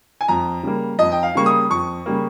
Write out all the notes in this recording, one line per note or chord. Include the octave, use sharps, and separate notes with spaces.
G#5
F2 A#5
C#3 G3 A#3
F2 D#5
G5
F5
C#3 G3 A#3 C#6
D#6
F2 C#6
C#3 G3 A#3